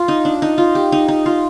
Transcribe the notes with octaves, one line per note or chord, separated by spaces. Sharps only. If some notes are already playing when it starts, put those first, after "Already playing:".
Already playing: F4
D#4
D4
D#4
F4
G4
D#4
D#4
F4